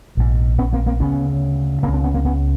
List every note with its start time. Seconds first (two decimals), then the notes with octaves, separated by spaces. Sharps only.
0.17 A#1 G#2
0.59 B3 C#4
0.73 A#3 C4
0.86 A#3 C4
1.00 D2 C#3 B3 C#4
1.83 C#3 A#3 C4
1.88 C#2
1.93 C4 D4
2.04 B3 C#4
2.14 A#3 C4
2.25 B3 C#4